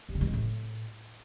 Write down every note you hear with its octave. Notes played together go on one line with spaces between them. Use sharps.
G2
C#3
G3
G#3
A2